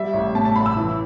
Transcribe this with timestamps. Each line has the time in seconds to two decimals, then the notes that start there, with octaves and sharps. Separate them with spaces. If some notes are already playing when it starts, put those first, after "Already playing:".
Already playing: G3 E5
0.14 A1
0.35 A2 A5
0.45 A5
0.56 A1 B5
0.66 E6
0.76 E3